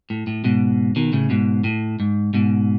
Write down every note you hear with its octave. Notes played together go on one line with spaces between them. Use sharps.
A2
A2
G#2 B2
B2 D#3
A2 C#3
G#2 B2
A2
G#2
G#2 B2